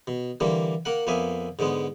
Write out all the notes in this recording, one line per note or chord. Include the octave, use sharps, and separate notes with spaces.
B2
D3 E3 G3 A#3
A#3 A#4 F#5
F2 A#3 B3 E5 G#5
G#2 D3 G#3 B3